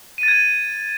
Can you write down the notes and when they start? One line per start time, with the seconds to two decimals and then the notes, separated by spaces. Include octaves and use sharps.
0.18 D#7
0.23 A6
0.28 G#6